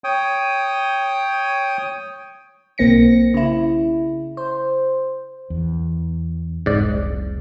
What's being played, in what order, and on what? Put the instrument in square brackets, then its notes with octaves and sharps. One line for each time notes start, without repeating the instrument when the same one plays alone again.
[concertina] C#5 G5 D#6
[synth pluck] B1 A#3 C4 A#6 C#7
C#3 E4
C5
[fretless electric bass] E2
[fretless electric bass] F1 C2 [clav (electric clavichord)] G#2 D5